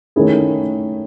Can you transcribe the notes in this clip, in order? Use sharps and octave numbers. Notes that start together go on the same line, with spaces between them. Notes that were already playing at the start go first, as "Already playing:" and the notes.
D#3 A3 C#4 E4 G#4